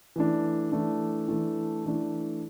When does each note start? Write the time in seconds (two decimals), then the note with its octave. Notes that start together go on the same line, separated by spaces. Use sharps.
0.16 E3 A3 D4
0.72 E3 A3 D4
1.28 E3 A3 D4
1.85 E3 A3 D4